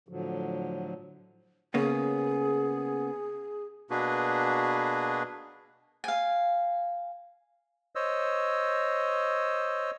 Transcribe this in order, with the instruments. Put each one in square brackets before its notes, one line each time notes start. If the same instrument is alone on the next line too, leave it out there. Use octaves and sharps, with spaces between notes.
[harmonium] A2 D3 F3 F#3
[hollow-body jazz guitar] C#3 A#3 B3 [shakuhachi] G#4
[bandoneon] B2 A#3 D4 F#4 G#4 B4
[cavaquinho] F5 G#5
[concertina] C5 C#5 D#5 E6